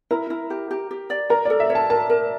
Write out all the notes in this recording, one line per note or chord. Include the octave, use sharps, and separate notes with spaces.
E4 A#4
E4
G4
G4
G4
D5
A#4 A#5
A4 D5
E5
C#5
A5
A#4 A5
A#4